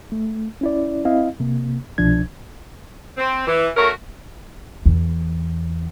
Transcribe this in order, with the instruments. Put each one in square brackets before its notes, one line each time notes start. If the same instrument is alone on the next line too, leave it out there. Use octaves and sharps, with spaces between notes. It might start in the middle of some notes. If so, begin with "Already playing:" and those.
[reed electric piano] A3
C#4 E4 D5
C4 E4 D#5 F5
C3 A#3
C2 B2 F3 D4 G#6
[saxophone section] C4
E3
A3 C#4 F#4 A#4
[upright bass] E2